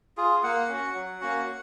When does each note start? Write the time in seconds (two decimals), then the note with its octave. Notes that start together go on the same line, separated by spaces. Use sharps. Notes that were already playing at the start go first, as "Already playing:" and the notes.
0.17 F4 G#4
0.43 A#3 F#5
0.69 C#4 F#4
0.95 F#3
1.21 A#3 C#4 F#4